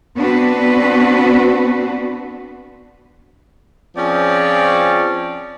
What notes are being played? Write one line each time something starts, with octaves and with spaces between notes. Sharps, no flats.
B3 C4 D4 F#4 B4
F3 C4 C#4 G#4 D5